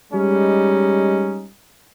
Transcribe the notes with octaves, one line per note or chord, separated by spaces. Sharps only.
G3 G#3 C#4 D#4